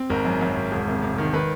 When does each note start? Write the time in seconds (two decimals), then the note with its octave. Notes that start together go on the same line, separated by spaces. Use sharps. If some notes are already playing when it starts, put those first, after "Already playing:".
Already playing: C4
0.10 G#1 A#4
0.25 F#2
0.41 F#2
0.56 G#1
0.72 E1
0.87 C3
1.02 C3
1.18 D#3
1.34 D#3 B4